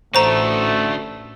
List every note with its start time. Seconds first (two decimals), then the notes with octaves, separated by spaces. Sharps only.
0.15 A1 D3 A3 F#4 C5 A#5